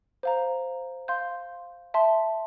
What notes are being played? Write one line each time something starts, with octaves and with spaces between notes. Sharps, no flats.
C5 F5 A#5
F5 C6 G6
E5 A5 C6